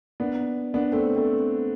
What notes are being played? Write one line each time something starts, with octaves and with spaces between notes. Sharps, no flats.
B3 D4
B3 D4
A3 C4
A3 C4